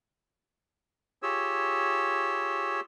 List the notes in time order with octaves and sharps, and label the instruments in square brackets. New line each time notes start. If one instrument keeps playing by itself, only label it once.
[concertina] F4 G4 G#4 C#5 E6